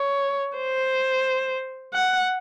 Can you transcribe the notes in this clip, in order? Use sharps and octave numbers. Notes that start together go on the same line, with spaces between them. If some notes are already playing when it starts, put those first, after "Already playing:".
Already playing: C#5
C5
F#5